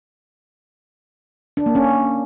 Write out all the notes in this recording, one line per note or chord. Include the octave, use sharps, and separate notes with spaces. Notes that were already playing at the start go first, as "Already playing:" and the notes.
D4
A#3
C#4